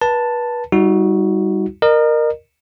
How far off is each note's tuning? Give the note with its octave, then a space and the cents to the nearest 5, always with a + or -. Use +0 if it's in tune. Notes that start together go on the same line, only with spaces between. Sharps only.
B4 -30 A5 +5
G3 +0 D#4 +40 F#4 +0
A#4 +0 D#5 -40